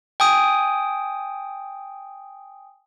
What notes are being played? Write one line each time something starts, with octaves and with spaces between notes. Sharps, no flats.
G5 G#5 D#6